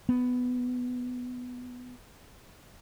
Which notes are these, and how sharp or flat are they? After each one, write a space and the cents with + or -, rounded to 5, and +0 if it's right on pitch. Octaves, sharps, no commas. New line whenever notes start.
B3 +10